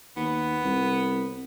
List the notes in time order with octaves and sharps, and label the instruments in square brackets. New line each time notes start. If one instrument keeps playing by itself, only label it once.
[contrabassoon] D#2 [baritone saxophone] B3
[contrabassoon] C2